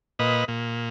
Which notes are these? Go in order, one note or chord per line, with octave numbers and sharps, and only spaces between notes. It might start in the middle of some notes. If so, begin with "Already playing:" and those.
A#2 B4 D#5
A#2